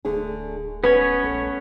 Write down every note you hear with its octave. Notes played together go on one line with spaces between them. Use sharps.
D1 D3 A3 G#4
B3 C#4 B4 C#5
A#1 A3